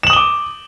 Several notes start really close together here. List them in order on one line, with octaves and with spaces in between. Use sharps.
E7 F#7 D#6 G7 D6